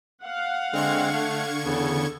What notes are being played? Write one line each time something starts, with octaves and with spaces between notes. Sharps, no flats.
F5 F#5
D3 G#3 C4 C#6 G#6
A3
E2 C#3 B3 A4